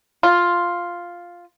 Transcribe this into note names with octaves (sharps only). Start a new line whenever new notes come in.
F4